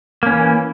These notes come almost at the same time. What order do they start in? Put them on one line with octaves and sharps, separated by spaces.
A#3 C#4 E3